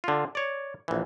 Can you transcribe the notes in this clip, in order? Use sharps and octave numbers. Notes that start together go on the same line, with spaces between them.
D3 F4
C#5 D5
A#1 E3